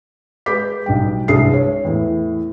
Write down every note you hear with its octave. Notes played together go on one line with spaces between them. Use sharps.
G#3 B4 D6 G6 B6
B1 G3 G5
C2 G2 G#3 G#4 D#6 C7
C#5
E2 A2